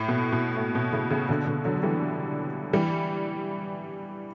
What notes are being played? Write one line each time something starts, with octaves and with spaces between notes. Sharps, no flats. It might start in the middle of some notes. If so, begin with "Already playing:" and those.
Already playing: A2
B2
B2
A2
B2
A2 C#3
A2 C#3
B2 D3
B2 D3
D3 F#3
F#3
E3 G3
E3 G3